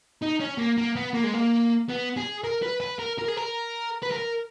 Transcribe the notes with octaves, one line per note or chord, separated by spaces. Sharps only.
D#4
C#4
A#3
A#3
B3
A#3
G#3
A#3
B3
G#4
A#4
B4
B4
A#4
A#4
G#4
A#4
B4
A#4